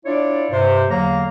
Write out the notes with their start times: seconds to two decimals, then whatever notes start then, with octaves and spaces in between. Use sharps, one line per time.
0.05 D4 E4 F4 C#5 D5
0.50 G2 C3 C5
0.89 E2 D3 F#3 A#3 F5 A#5